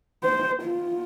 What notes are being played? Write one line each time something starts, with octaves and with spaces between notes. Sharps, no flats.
C5
F4